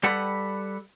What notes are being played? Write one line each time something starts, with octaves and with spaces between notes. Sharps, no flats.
G3 G4 A4 B4 F#5